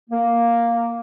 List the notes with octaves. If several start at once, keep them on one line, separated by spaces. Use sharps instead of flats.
A#3